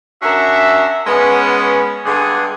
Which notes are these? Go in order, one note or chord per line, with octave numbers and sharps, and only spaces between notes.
C#4 D4 F#4 A#4 E5
G#3 B3 C#4
G2 D3 G#3 B3 G#4